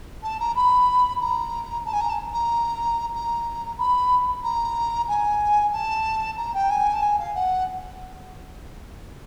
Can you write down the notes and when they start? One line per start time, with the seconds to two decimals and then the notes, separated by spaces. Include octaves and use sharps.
0.23 A5
0.39 A#5
0.55 B5
1.20 A#5
1.85 A5
1.92 G#5
2.00 A#5
2.09 A5
2.32 A#5
3.14 A#5
3.78 B5
4.43 A#5
5.07 G#5
5.72 A5
6.36 A#5
6.53 G5
6.69 G#5
6.93 A5
7.02 G#5
7.18 F5
7.34 F#5